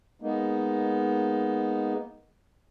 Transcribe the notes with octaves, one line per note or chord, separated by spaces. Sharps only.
G#3 A#3 B3 D#4